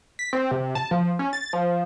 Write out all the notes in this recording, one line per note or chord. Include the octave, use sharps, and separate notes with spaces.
B6
C4
C3
A5
F3
C#4
A6
F3